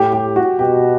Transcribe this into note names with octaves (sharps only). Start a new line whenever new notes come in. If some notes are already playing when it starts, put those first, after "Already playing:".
Already playing: A2 G4
G4
F#4
B2 G4